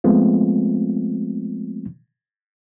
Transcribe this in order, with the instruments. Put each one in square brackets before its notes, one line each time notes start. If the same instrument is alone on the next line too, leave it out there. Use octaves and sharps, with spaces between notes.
[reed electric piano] F3 G#3 A3 B3 C4 F4